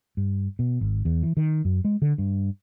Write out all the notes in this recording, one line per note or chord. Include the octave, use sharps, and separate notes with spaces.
G2
B2
G#1
E2
E3
D#3
F#2
G#3
D3
G2